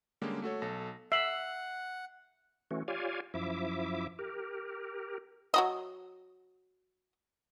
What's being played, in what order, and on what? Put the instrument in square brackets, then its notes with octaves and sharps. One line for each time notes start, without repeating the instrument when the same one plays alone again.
[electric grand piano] D3 G3 G#3 A#3 C#4 G4
A3 F#4 A4 C#5
B1 A4 A#6
[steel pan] E5 [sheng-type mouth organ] F#5 [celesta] C7 F#7
[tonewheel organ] E3 A3 C#4 F#4
F4 G4 C#5 D5 F5 G#5
F#2 F3 E4 E5 D6
G4 A#4
[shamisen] F#3 F#4 D#5